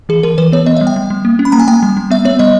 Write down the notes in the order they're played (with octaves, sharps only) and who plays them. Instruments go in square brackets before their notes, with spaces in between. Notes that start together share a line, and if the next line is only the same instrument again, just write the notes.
[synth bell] E3 G#4
E3 A#4
E3 B4
B3 C#5
B3 D#5
E5
G3
G5
G3
G3
A#3
C#4
B5
A#3 A#5
G#5
A#3 G5
G3
G3
B3 E5
B3 C#5
G3 D#5